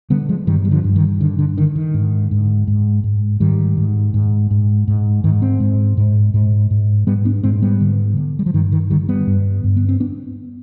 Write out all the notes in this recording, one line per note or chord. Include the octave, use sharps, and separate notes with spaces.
D3 G3 B3
F3 G#3
G2 D#3 G3
G3
D3 F3
G2
D#3
D3 D#3
D3
D3 D#3
D#3
G#2
G#2
G#2
G#2
G#2 D#3 G3
G#2
G#2
G#2
G#2
G#2 D#3
G#3 C4
G#2
G#2
G#2
G#2
G#2 G3 B3
B3 D4
G#2 G#3 C4
G3 B3
D3
D3
G3
F3
G2 D#3
D#3
D3 D#3 G3
G3 B3
G2
G2
B3
C4
B3 D4